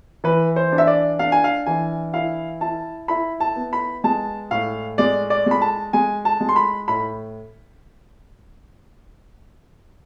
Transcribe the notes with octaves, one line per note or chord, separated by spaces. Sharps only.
E3 B4
C5
D4
E5
D5
D4 F5
G#5
F5
E3 G#5
E4 F5
E4 A5
E4 B5
A5
B3
B5
G#3 A5
A2 F5
G#3 D5
D5
G#3 B5
A5
G#3 G#5
A5
G#3
C6
B5
A2 B5